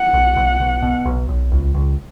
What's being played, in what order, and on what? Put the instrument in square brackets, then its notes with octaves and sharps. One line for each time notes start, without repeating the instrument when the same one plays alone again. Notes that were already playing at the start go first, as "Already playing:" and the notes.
Already playing: [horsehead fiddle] F#5
[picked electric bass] B1
B1
B1
B2
B1
B1
C#2
C#2